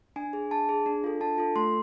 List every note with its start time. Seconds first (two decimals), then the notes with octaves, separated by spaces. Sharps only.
0.16 D4 G#5
0.33 G#4
0.51 D4 A5
0.69 G#4
0.86 D4
1.04 F4 A4
1.21 D4 A5
1.38 F4 A4
1.56 A3 C6